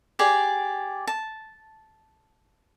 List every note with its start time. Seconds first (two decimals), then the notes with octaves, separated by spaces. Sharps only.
0.19 G4 G#4 D5
1.07 A5